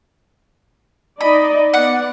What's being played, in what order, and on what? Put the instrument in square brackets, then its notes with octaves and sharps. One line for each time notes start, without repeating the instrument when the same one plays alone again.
[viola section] D#4 D5 D#5 [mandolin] B5
[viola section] B3 D5 [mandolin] F#5